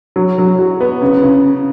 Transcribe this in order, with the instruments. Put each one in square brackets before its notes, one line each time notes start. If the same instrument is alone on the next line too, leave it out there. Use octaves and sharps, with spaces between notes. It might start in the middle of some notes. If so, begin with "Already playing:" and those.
[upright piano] F#3
F#3
F#4
B3
C#3
C#3